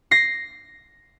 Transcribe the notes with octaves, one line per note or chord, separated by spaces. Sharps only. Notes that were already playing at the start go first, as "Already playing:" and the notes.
A#6 C7